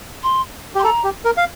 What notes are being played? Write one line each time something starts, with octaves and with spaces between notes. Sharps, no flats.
C6
G4
C6
A4 A#5
G4
A#4
F5